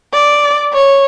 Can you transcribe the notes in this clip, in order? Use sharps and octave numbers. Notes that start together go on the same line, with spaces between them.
D5
C#5